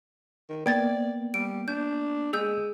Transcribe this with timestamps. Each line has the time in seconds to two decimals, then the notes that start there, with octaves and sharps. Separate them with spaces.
0.49 D#3
0.66 A#3 B3 D5 G5 G#6 A6
1.34 G3 D7
1.68 D4 G6
2.33 G#3 G#4 E6 G6